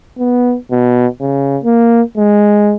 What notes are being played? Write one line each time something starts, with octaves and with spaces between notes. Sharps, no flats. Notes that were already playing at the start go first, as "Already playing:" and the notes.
B3
B2
C#3
A#3
G#3